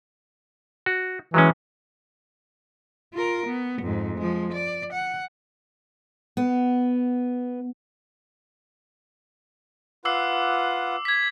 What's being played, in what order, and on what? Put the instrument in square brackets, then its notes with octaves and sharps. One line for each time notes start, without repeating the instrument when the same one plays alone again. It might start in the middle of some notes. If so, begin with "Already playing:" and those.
[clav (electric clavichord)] F#4
[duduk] E3 [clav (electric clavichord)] F#3 G#3 C#4
[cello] F4 A#4
B3
F2 G#2
F3 G#3
D5
F#5
[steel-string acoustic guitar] B3
[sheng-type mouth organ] F4 B4 F#5 [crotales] D6 E6 C7
[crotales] G#6 B6